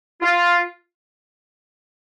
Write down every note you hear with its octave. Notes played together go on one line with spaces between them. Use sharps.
F4